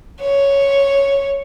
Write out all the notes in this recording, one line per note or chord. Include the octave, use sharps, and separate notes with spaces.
C#5